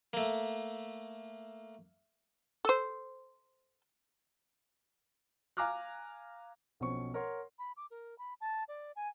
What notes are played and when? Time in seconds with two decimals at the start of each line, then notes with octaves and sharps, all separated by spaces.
0.13 A3 A#3
2.65 A4 C5
5.57 F5 G#5 A#5 D6 F6 F#6
6.80 B1 B2 F3 C4 C#4 C#6
7.14 A#4 C#5 F#5 C6
7.59 B5
7.77 D6
7.91 A#4
8.18 B5
8.41 A5
8.68 D5
8.96 G#5